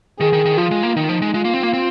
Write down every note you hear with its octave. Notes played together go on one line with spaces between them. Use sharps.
D#3 G#4
D#3
D#3
F3 F4
G#3
A#3
D#3 D#4
F3
G#3
G#3 F4
A#3
C4
A#3
C4